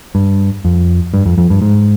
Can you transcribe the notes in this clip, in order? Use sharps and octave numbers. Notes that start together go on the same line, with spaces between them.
G2
F2
G2
F2
F2
G2
G#2